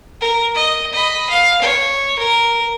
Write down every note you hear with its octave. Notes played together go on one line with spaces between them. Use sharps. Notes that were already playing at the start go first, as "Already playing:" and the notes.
A#4
D#5
D#5 B5
F5
C#5
A#4